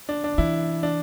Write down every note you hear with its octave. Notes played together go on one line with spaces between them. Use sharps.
D4
D4
E3 E4
D4